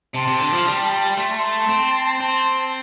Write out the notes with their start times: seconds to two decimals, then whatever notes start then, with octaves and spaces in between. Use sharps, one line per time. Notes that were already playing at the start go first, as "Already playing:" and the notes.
0.14 C3 A5 C6
0.27 C3
0.40 D3
0.53 F3
0.66 G3
1.18 A3 C6
1.28 A#5
1.37 A5 C6
1.69 C4
2.20 C4 A5 C6